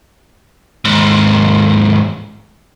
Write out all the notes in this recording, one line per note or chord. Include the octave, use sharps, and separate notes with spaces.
D#2 G#2